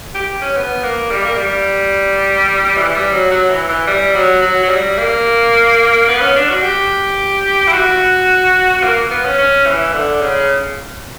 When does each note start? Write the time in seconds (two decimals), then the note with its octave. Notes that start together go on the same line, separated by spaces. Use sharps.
0.15 G4
0.42 C#4
0.56 B3
0.83 A#3
1.11 G3
1.25 A#3
1.37 G3
2.77 E3
2.95 G3
3.13 F#3
3.32 F#3
3.50 E3
3.69 E3
3.87 G3
4.15 F#3
4.42 F#3
4.63 F#3
4.69 G3
4.98 A#3
6.08 B3
6.21 C#4
6.36 D4
6.49 F#4
6.63 G4
7.68 E4
7.73 F#4
8.84 A#3
9.11 B3
9.25 C#4
9.38 C#4
9.66 E3
9.94 D3
10.21 C#3